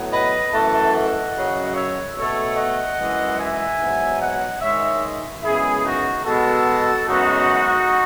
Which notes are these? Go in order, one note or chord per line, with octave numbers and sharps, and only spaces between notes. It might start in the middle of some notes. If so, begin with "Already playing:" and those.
Already playing: A2 F#3 B3
B4 D#5
F#2 E3 A3 F#5 A5
D#5 F#5
F#2 C#3 F#3
C#5 E5
B2 A3 A4 C#5
D#5 F#5
F#2 E3 G#3
E5 G#5
G#2 F#3 B3
D#5 F#5
G#2 D#3 G#3 C#5 E5
F#2 C#3 G#3 B3 E4 G#4
D#4 F#4
B2 G#3 B3 F#4 A4
F#2 C#3 G#3 B3 D#4 F#4